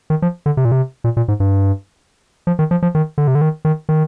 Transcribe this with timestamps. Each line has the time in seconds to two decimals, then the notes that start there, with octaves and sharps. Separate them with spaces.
0.10 D#3
0.22 F3
0.46 D3
0.57 C3
0.65 A#2
0.72 C3
1.04 A#2
1.17 A#2
1.28 G#2
1.40 G2
2.47 F3
2.59 D#3
2.71 F3
2.83 F3
2.95 D#3
3.18 D3
3.27 C3
3.35 D3
3.42 D#3
3.65 D#3
3.89 D#3